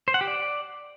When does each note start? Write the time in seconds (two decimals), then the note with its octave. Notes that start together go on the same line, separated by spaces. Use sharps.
0.08 C5
0.14 F#5
0.21 G4
0.27 D5